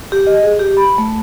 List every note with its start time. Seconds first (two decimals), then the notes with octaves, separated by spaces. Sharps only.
0.12 G4
0.27 D#5
0.43 G#4
0.59 G4
0.77 B5
0.98 A3